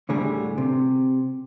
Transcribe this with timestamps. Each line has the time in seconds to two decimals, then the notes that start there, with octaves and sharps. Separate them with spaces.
0.09 D2 A2 D3 G3 G4 G#4
0.58 C3